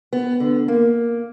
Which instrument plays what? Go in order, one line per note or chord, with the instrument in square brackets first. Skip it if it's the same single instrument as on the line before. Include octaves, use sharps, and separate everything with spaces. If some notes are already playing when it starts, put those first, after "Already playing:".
[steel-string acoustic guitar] B3
D3
A#3